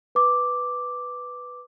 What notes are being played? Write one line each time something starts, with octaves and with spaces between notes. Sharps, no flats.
B4 D6